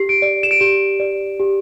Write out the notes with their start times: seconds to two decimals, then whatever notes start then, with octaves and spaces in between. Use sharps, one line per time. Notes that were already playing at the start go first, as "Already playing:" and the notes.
Already playing: G4 C7
0.09 D7
0.22 D5
0.43 E7
0.51 D7
0.60 G4 E7
1.00 D5
1.40 G4